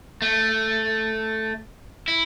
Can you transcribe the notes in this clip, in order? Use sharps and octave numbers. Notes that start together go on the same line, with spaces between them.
A3
E4